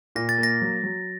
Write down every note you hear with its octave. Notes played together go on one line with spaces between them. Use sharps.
A#2 A#6
A6
A#3
A#6
F#3
F#3